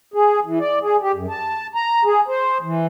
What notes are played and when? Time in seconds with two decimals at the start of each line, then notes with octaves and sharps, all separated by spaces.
0.14 G#4
0.46 E3
0.60 D5
0.82 G#4
1.01 G4
1.15 F#2
1.30 A5
1.75 A#5
2.05 G#4
2.28 C5
2.63 E3